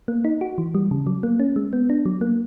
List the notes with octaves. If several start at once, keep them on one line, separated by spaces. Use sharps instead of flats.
A#3
D#4
F#4
E3
G3
C#3
F#3
A#3
C#4
G#3
B3
D4
F#3
A#3